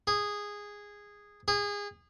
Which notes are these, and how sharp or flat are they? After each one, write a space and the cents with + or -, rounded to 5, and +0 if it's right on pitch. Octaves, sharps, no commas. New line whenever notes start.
G#4 -10
G#4 -25